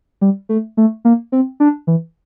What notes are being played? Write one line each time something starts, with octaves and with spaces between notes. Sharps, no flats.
G3
A3
A3
A#3
C4
D4
E3